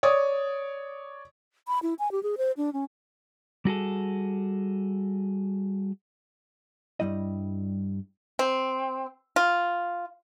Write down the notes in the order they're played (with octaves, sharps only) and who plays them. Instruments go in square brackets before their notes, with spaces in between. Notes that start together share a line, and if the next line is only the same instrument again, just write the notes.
[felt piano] C#5 D5 D#6
[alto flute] B5
E4
G#5
G4
G#4
C5
D4
C#4
[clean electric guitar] G3 F#4 G#4 A4
[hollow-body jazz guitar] G2 C3 G3 E4 D#5
[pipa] C4
F4